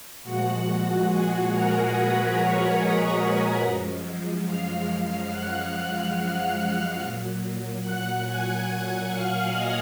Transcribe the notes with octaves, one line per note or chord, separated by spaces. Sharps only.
A#2 F3 G#3 F#4 F#5
G#4 G#5
A#4 A#5
B4 B5
C#5 C#6
D#5 D#6
F#2 F3 G#3
F5 F6
F#5 F#6
F#5 F#6
A#2 F#3
F#5 F#6
G#5 G#6
F#5 F#6
F5 F6
D#5 D#6